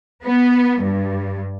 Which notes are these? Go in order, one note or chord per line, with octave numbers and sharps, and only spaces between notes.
B3
G2